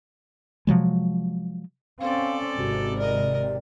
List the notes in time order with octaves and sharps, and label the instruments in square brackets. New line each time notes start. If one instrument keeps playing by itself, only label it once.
[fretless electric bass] C3 F3 F#3 G#3
[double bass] C4 C#4 [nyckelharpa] A4 D5 [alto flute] F5
[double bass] G#1 [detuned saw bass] C3 [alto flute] F#4
[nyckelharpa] A#4 D#5 [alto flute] D5